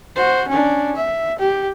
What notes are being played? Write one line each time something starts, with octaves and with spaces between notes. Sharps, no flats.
F#4 C5
C#4 D4
E5
G4